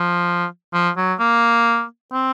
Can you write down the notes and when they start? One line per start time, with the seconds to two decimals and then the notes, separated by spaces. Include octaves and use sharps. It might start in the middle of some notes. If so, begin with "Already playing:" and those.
Already playing: F3
0.73 F3
0.97 F#3
1.20 A#3
2.13 C4